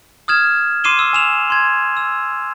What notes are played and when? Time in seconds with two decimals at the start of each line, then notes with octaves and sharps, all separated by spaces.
0.28 D#6 F6 G#6 E7
0.84 C6 D6 C7 D#7 E7 G7
0.99 E6
1.13 G#5 E7 F7
1.50 C6 G#6
1.97 E6